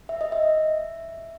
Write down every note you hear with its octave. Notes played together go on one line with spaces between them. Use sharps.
E5
D#5
E5